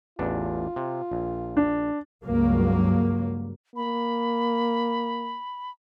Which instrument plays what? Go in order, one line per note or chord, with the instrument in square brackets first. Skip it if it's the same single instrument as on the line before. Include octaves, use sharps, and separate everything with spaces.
[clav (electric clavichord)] A1 E2 D4 [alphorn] F4
[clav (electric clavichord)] C3
A#1
[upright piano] D4
[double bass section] C#2 G2 F#3 A#3
[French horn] A#3 [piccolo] B5